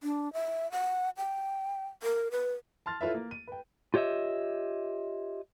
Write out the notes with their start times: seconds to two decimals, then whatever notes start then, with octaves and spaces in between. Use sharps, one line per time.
0.03 D4
0.33 E5
0.72 F#5
1.17 G5
2.03 A#4
2.31 B4
2.86 A5 C6 F6 A6
3.01 E4 F4 A4 B4 C#5 E5
3.14 A#3
3.31 D#7
3.47 B4 G5
3.94 F4 G4 C#5 D#5 E5